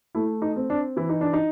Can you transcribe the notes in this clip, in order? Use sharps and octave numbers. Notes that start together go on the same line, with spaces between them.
A3 E4
D#4
C4
D4
E3 E4
D#4
D4
D#4